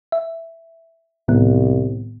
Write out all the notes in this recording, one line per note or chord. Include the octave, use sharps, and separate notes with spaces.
E5
C2 A2 D#3 B3